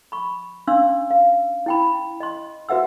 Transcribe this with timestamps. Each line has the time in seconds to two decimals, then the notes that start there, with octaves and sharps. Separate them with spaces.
0.12 B5 C#6
0.68 C#4 D4 F5 C6 E6
1.11 F5
1.66 E4 G5 B5
2.20 D#5 C6
2.69 F#4 B4 E5 F#5 E6